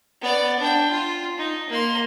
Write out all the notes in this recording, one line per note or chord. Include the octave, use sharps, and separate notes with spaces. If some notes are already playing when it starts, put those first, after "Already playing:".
B3 D5
D4 G5
F4
D#4
A#3 C6